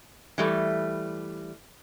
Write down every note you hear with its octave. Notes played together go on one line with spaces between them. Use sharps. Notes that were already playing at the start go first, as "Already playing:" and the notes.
E3 G3 A3